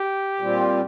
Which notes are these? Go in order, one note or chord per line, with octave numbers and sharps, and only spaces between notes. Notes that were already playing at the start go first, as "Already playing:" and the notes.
Already playing: G4
A#2 G3 C4 F4